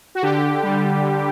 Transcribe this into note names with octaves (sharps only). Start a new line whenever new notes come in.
F#4
D3 G4
G3
D3